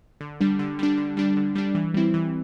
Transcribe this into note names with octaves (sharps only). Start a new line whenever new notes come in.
D3
G3 D4
D3
G3 D4
D3
G3 D4
D3
G3 D4
E3
G3 C4 E4
E3